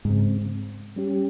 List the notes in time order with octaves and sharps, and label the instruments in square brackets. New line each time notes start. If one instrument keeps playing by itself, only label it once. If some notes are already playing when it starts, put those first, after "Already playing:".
[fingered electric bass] G#2 [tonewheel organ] C#3 G#3 C4
[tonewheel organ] G3 C#4 G4